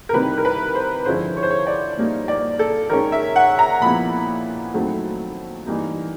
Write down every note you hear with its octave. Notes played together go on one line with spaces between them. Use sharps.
A#4
C3 D#3 G3 C4 E4 B4
A#4
B4
C5
D3 F3 G#3 C#4 E4 C5
C#5
C5
C#5
D5
A#2 G3 A#3 D#4
D5
A4
D#3 G#3 C#4 A#4
E5
F#5
A#5
A#2 F3 G#3 B3 E4 B5
D#3 F#3 A3 C4
E3 G3 A#3 D#4